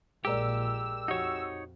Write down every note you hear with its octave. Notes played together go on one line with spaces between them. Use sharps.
A#1 A#2 G#3 G4 A#4 D5 E6
F2 D#4 F#4 G4 C#5